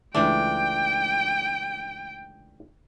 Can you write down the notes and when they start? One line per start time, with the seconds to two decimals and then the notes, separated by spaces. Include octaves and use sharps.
0.15 C#2 E3 A3 D4 G5